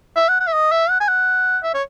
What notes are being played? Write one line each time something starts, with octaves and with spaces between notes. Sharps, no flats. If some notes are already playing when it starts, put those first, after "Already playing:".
E5
F#5
F#5
E5
D#5
E5
F#5
G#5
F#5
E5
C#5